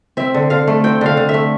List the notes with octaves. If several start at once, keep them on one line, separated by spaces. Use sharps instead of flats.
C4 E5
D3
D3 F5
A3
C4 G5
D3 F5
D3
E5
A3